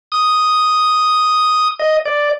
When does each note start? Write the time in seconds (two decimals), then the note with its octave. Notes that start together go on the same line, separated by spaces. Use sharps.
0.12 D#6
1.80 D#5
2.05 D5